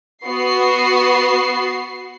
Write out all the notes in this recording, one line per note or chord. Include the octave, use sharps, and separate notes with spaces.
B3 F#4 C7